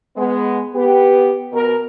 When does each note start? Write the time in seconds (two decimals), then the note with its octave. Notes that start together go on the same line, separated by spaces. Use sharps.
0.16 G#3 B3
0.74 B3 G4 B4
1.52 B2 A#4